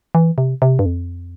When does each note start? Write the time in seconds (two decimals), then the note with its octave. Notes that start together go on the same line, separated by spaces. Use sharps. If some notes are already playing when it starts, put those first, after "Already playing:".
0.15 E3
0.38 C3
0.62 C3
0.79 G2
0.86 F2